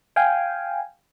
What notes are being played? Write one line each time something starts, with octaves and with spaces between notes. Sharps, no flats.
F5 G5 G#5